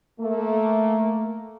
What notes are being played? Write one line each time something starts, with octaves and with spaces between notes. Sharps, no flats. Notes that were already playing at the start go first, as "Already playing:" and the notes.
A3 A#3